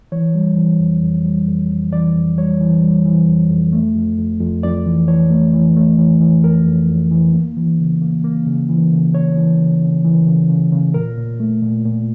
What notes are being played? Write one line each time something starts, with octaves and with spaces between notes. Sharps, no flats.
E3 C#5
G3
E3
F2
F2
G3
F2
F2
E3 D5
F2
G3 C#5
E3
G3
E3
F2
F2
A3
F2
F2
F2
F2 D5
E3
E3 C#5
A3
E3
A3
E3
E3
F2 A#4
F2
F2
E3
A#3
E3
C#3
A#3
A#3
C#3
E3
C#3
C#3 C#5
E3
C#3
C#3
E3
C#3
C#3
C#3
A#2 A#4
A#2
A3
A#2
A#2